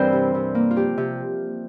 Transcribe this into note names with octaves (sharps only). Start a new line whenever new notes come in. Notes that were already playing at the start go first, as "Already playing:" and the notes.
Already playing: G2 E3 G3 C4 A#4 C5
C3
C3
A#3
F4
F3 G4
C3